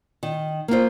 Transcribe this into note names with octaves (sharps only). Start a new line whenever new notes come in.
D#3
A#3 F4 C5